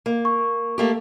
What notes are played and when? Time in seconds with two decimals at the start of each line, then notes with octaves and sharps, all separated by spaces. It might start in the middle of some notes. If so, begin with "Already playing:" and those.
0.06 A#3
0.25 C#6
0.78 A3 A#3 G4